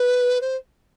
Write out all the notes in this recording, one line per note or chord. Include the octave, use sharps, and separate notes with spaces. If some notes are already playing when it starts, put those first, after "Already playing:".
Already playing: B4
C5